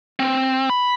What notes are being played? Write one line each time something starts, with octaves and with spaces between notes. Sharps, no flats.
C4
B5